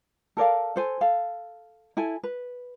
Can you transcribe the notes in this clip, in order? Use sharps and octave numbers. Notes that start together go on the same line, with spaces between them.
A4 A#4 D5 F5
A4 C5 G#5
A4 F5
E4 A4 G#5
B4